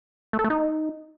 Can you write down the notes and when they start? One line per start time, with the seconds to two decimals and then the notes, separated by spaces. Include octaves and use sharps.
0.33 A3
0.39 A4
0.44 A3
0.50 D#4